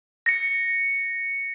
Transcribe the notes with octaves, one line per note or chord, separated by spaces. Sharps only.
A#6 C#7